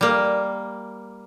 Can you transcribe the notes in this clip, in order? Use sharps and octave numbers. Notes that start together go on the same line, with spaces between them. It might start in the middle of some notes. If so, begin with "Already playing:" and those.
G3 A#3